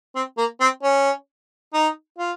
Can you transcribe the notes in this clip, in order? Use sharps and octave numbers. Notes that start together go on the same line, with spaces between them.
C4
A#3
C4
C#4
D#4
F4